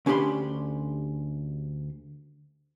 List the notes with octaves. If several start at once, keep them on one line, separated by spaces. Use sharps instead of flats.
D2 C#4 D4 G4 B5 C6